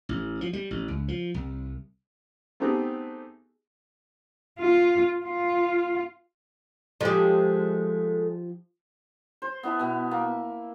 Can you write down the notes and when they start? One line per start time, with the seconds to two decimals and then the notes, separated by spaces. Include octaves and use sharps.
0.09 A1
0.41 F3
0.53 G3
0.71 A1
0.88 C#2
1.08 F3
1.34 C2
2.60 A3 B3 C4 D#4 G4 G#4
4.60 F4
5.24 F4
7.01 F3 G#3 A3 G4
9.42 C5
9.63 B3 E4 E5 A5
9.79 B2 B3
10.11 A#3